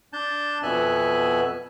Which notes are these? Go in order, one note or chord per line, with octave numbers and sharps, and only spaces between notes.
D4 A5 G6
F2 B2 B3 E5 G#5 F#6